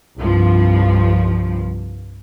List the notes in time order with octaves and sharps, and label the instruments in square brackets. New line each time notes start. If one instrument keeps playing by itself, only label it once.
[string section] C2 G2 F3